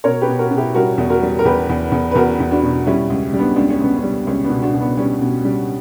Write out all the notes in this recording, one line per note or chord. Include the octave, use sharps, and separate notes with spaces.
B2 A#4 C#5
G4 B4
B2
F#4 A#4
B2
E4 G4
G3 F#4 A#4
E2
F#4 A#4
G3
A#4
E2 G4 B4
E2
E2
B4
E2 F#4 A#4
E2
D4 F#4
B2
G3 C#4 E4
C#2
G3
B3 D4
C#2 D4
C#4
C#2 B3
C#4
G3
C#2 C#4
B3 D4
B2
D4 F#4
B2
B3 D4
G3 C#4
B2
G3